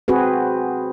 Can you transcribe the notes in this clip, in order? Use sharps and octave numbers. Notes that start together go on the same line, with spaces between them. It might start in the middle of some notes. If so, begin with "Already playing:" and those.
C4 F#4 G#4 B4